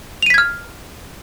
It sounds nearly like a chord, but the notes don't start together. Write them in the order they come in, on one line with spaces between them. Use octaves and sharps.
F7 D#7 B6 G#6 F6